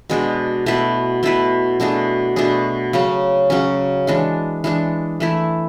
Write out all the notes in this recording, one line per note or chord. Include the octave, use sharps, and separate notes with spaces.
B2 G#3 D4
B2 A3 E4 B4
B2 A3 E4 B4
B2 A3 D4 G#4
B2 A3 D4 G#4
C#3 F#3 C#4
C#3 F#3 C#4
E3 G#3 D4
E3 G#3 D4
E3 A3 E4